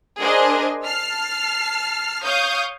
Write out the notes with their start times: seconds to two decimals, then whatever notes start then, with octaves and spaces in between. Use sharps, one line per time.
0.21 D4 G#4 A#4 C5 D#5
0.84 A5 F6 C7
2.24 C#5 F5 C#6 D#6 G6